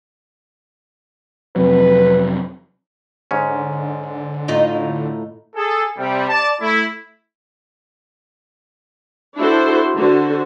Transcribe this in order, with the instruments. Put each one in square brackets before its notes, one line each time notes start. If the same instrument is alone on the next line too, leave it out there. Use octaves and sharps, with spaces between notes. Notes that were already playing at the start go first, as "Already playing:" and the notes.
[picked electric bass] F2 C3 F#3 [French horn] B4
[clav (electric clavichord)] G#2 C#4 [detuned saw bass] D3
[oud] A2 D#4 F4
[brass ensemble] G#4 A4
C3 G3
D5 A5
A3 E4
[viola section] D4 E4 F#4 A4 C5
D3 F#4 C5